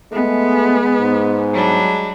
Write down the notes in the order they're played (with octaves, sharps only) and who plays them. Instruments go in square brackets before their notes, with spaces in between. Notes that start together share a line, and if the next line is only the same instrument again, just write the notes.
[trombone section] G#3 [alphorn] A3 [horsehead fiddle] B3
[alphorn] G#2
[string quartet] F#3 G3 D4